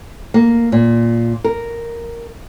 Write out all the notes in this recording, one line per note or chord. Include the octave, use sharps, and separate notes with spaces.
A#3
A#2
A#4